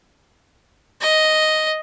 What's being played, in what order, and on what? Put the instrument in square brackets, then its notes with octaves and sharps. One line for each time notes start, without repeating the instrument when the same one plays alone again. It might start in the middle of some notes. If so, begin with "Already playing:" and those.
[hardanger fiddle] D#5